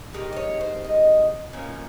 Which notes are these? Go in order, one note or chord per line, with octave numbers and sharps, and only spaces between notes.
C3 D#3 G#3 D#4 G4
D#5
C#5
C5
D#5
A#2 F3 A#3 C#4